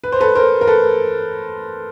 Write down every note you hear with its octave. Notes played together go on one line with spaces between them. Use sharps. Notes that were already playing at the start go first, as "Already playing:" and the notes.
B4
C5
A4 B4
A#4 C5
A#4
A4 B4